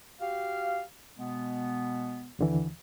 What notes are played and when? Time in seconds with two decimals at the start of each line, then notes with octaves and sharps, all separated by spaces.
0.21 F#4 G4 F5
1.18 B2 G#3 B3
2.39 D#2 D3 E3